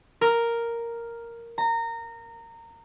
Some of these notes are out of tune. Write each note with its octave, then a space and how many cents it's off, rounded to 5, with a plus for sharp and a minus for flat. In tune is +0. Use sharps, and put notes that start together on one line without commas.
A#4 +0
A#5 -20